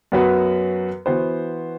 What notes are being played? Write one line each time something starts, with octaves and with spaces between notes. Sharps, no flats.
F#2 F#3 B3 F#4 B4
E3 B3 F#4 C5